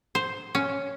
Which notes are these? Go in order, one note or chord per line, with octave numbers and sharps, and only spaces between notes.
C5
C#4